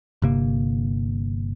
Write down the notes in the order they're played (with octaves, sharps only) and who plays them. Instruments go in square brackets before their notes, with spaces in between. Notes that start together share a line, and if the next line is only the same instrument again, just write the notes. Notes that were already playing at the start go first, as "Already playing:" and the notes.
[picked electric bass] G1 C3 A#3